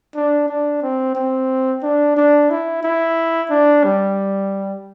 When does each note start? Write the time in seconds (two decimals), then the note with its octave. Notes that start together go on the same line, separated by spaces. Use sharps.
0.15 D4
0.49 D4
0.82 C4
1.15 C4
1.83 D4
2.16 D4
2.50 E4
2.83 E4
3.50 D4
3.84 G3